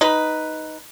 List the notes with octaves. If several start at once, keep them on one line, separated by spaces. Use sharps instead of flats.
D#4 B4